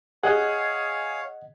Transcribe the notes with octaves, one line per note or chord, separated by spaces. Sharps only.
G#4 C#5 D#5 F5 F#5